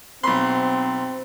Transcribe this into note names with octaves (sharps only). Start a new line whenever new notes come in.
B1 C4 B5 C6